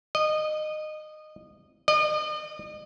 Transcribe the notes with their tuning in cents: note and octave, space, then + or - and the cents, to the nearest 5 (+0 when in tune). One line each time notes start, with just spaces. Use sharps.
D#5 -20
D#5 -40